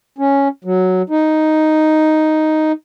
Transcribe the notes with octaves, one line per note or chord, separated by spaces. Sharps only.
C#4
F#3
D#4